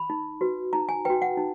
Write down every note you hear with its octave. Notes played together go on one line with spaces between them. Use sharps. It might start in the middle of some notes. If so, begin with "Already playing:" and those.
Already playing: B5
D#4
F#4 B4
D#4 A#5
G#5
F#4 B4 G5
F#5
D#4